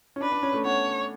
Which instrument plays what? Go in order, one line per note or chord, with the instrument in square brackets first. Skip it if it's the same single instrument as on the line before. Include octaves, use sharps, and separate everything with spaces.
[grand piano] C#4
[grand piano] D4 [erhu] B4
[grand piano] D4
C#4
A3
[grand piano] B3 [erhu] C#5